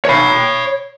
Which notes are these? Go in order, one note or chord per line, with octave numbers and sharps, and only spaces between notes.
C#5 B5